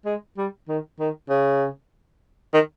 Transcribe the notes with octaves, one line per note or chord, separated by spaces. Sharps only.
G#3
G3
D#3
D#3
C#3
D#3